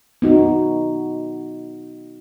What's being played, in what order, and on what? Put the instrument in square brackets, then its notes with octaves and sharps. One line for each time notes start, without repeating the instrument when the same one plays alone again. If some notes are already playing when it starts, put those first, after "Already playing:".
[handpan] B3 D#4 F#4